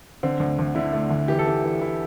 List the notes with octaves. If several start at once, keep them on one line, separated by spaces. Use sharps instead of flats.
D3 C4
D2
D2
D3 E4
A3
D2
E3 G4
A4
E3 G4
E3
E3 E4